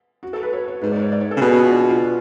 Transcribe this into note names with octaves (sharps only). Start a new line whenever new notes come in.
F#4
A4
B4
C#5
C#5
G#2 B4
D5
C#5
D5
C#5
A4
C#3
B2 G#4
F#4
F4
D4
F#4
F4